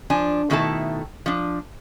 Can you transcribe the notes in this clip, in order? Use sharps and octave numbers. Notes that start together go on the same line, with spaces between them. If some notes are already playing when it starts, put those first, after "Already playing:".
F3 D4 G#5
B2 D#3 A3 E4 A4 A5
F3 D4